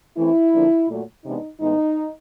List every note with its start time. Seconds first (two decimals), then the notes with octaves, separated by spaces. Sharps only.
0.17 E3 A3 C4 E4
0.53 D3 F3 A#3 D4
0.89 A#2 F#3 A3
1.25 C3 E3 G#3 B3 D4 D#4
1.61 A2 E3 G#3 B3 D#4